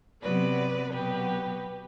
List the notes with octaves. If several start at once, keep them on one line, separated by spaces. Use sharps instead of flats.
C3 F#3 B3 B4 D5
B2 F#3 B3 G4 B4